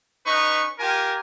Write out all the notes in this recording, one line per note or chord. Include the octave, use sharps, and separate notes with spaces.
C#4 D#4 B4 C#6
F4 G4 A#4 G#5